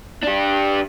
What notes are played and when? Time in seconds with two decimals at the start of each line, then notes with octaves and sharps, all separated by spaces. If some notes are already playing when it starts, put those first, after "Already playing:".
0.24 D4 G4